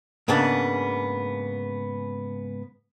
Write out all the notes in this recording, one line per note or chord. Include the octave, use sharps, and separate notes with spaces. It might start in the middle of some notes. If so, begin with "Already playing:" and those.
G#2 C#3 A#3 B3 D4